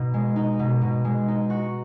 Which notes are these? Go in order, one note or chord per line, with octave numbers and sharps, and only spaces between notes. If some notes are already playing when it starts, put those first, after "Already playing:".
Already playing: B2 D#4
G#3
D#4
B2
B2
G#3
D#4
F#4